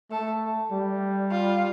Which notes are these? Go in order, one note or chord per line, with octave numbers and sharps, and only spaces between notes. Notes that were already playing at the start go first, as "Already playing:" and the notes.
A3 A4
G3
F4